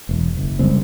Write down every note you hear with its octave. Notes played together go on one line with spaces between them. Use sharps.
E1
F#1
C#3 G3 G#3 C4